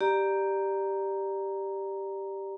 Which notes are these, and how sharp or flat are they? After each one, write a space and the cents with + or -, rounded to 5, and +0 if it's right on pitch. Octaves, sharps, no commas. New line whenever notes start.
G4 +0 D5 +15 A#5 +0